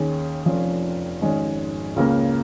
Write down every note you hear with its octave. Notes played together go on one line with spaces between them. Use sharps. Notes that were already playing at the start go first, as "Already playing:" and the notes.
Already playing: D#2 D#3 C#4 G#4
F1 F2 F3 C#4 F4
G#1 G#2 G#3 C#4
C#2 C#3 A#3